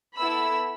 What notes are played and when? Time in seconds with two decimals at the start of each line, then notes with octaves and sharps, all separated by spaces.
0.17 B3 E4 A4 B5 E6